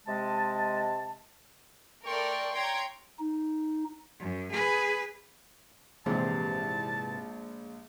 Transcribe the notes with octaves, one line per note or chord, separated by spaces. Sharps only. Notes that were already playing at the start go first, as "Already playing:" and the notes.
C3 G#3 D#5 A5
A3 A#4 D5 G5 C6 C#6
C#5 G5 A#5 C6 G#6
D#4
F#2
G#4 B4
A#1 G#2 C3 E3 G#3 A5